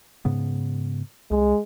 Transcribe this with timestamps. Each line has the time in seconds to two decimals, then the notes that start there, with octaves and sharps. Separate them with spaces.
0.25 G#2 C#3 B3
1.31 C2 G#3